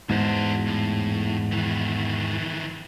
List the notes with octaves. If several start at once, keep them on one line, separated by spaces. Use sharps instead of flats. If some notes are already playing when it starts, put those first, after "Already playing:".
E2 G#2 F#4 C5
A2
D#3 E3